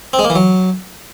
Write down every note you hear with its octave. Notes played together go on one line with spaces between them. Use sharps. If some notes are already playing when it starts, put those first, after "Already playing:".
C4
G#3
A#3
E3
F#3